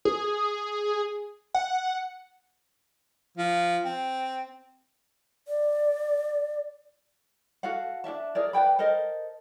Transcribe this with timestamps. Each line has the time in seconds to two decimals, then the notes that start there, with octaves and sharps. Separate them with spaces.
0.05 G#4
1.54 F#5
3.37 F3
3.85 C4
5.48 D5
7.63 F#4 A4 F5 F#5
8.04 D4 A#4 E5 A5
8.35 G#4 A#4 D5
8.53 B4 D5 G5 B5
8.79 A4 A#4 C5 D#5